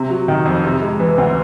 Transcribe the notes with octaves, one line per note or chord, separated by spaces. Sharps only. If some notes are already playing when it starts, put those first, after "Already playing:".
Already playing: C3
F#3
D#3
F2
C3
G#3
E3
D2